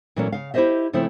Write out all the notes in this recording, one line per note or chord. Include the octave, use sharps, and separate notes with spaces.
A#2 E3 F#3 A3 C#4
C#3 F5
E4 G4 G#4 C5 D#5 E5
C#3 F3 A3 C4 E4